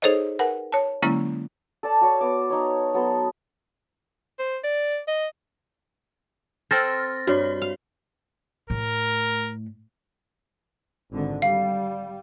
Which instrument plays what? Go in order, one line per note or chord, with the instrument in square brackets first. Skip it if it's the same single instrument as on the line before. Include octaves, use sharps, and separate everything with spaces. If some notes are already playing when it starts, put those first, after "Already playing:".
[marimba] D#4 G#4 A4 C5 C#5 D#5
A#4 B4 F#5 G#5
C#5 A5
D3 F#3 G#3 A#3 C#4 E4
[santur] A4 D5 A5
F#4 C#5
B3 D6
D#4 C#5
F#3 B3 A4 C6
[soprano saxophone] C5
D5
D#5
[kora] C4 A4 C5 [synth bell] F6 A6 A#6
[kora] G2 [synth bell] F#4 C#5
[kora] F5
[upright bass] A2 [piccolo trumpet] A#4
[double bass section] G#1 D3
[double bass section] G3 [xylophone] F5